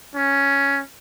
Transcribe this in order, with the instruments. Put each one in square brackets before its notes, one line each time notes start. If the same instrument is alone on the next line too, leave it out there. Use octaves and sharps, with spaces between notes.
[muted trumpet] C#4